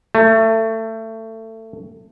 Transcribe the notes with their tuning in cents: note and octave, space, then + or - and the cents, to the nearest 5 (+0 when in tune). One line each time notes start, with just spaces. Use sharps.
A3 +25